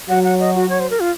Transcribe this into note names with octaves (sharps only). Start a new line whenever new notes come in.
F#3 F#5
F#5
D#5
F#4
C#5
C5
A#4
F4